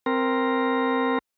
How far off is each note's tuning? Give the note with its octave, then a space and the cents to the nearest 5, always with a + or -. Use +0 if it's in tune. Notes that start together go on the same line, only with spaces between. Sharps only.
C4 +0 A#4 +0